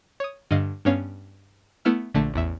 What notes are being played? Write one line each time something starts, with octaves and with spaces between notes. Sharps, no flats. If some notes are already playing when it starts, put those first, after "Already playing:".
C#5 D#6
G2 D3 D#5 F5
G2 B3 C#4 C#5 F5
A3 B3 E4 F6
A#1 D3 A3 A5
A1 E2 E5